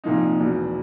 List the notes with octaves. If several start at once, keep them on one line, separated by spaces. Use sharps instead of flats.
C2 A#2 F3 A#3 D#4
E1 E2 B2